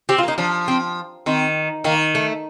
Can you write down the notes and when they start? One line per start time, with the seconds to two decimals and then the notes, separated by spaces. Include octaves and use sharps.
0.09 C4 G4
0.18 F4
0.23 A#3 D#4
0.38 F3 D4
0.68 C4
1.26 D#3 C4
1.84 D#3 A#3
2.15 A3